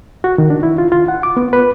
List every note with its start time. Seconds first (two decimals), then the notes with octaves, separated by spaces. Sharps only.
0.24 F#4
0.38 D#3
0.50 D4
0.63 E4
0.78 F4
0.92 F4
1.08 F#5
1.23 D6
1.37 B3
1.53 B4